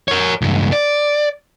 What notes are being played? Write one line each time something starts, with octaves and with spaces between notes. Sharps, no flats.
A#4 C#5
C#2 G2
D5